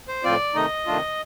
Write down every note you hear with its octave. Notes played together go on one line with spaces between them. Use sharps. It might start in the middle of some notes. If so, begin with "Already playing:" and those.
C5
A2 F3 C4 F4 D5
C3 D#3 A3 D#4 D#5
C3 D#3 A3 D4 F4